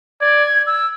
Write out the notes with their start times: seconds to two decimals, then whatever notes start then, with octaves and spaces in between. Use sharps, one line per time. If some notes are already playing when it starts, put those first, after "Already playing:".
0.21 D5 G#6
0.67 E6